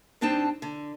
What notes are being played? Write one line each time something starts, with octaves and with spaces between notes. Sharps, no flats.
G2 C4 D4 D#4 G5 A5
D3